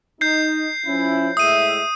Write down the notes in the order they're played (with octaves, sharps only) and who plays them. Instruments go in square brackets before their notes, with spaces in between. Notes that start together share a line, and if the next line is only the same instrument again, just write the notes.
[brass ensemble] D#4 [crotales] G6 C7
[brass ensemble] F3 C#4 E4
[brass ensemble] A2 G#3 E5 [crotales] D#6 D#7